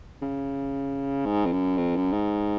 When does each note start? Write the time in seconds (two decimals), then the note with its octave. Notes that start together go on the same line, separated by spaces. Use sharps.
0.22 C#3
1.26 G#2
1.46 F2
1.52 F#2
1.78 F2
1.96 F#2
2.13 G#2